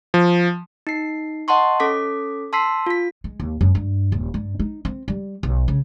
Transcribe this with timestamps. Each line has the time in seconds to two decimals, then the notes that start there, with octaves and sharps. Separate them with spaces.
0.14 F3
0.87 D#4 C7
1.48 D#5 F#5 A5 C6 C#6
1.80 C#4 A4 D6 B6
2.53 A5 C6 E6 B6 C7
2.86 F4 B6
3.24 G#3
3.40 D#2
3.61 F#2
3.75 G2
4.12 D#1
4.34 G2
4.59 D#4
4.85 C4
5.08 G3
5.43 B1
5.68 C#3